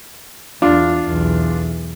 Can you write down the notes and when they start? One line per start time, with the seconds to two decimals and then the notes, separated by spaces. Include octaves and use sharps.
0.62 E2 D4 F4
1.06 B1 E2